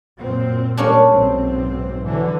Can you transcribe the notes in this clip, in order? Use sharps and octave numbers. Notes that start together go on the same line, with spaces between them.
F#2 A#2 C4
G3 A#3 C#4 D4
B1 G#2 C4
D3 E3 F#3